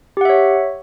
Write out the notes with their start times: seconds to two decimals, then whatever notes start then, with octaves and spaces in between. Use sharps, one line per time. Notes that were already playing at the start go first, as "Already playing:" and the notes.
0.17 G4
0.21 F#5
0.25 E5
0.29 C#5